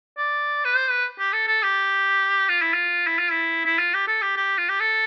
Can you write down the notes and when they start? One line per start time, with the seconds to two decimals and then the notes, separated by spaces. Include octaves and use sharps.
0.18 D5
0.65 B4
0.76 C5
0.90 B4
1.19 G4
1.33 A4
1.47 A4
1.63 G4
2.49 F4
2.61 E4
2.74 F4
3.07 E4
3.19 F4
3.31 E4
3.65 E4
3.79 F4
3.94 G4
4.07 A4
4.22 G4
4.36 G4
4.58 F4
4.69 G4
4.80 A4